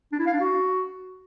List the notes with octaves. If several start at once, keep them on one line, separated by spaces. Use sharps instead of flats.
D4
E4
F5
D4
F#4